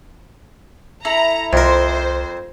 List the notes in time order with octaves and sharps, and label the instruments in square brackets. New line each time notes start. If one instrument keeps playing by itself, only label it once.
[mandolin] E4 A4 [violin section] A#5
[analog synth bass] C2 [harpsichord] F2 A#4 [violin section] C5